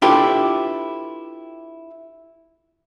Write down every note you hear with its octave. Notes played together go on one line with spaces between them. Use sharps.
D4 E4 F4 G4 A4 B4